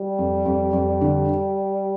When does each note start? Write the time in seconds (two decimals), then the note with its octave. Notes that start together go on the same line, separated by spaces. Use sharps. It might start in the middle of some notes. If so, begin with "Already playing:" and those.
Already playing: G3
0.19 F2
0.45 F2
0.73 F2
1.01 D3